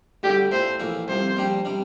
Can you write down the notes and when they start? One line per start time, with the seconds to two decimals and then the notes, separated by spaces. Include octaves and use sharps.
0.23 D2 D3 G3 G4
0.52 A#2 A3 E4 C5
0.80 A#1 A2 E3 A#3 E4
1.08 C2 C3 F3 C5
1.36 A#1 A#2 G3 D4 G4
1.65 C3 G3 D4